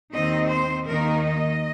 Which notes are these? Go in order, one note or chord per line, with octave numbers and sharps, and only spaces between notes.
D#2 D#3 C4 D#4 D#5
C5
D#2 D#3 A#3 D#4 A#4
D#5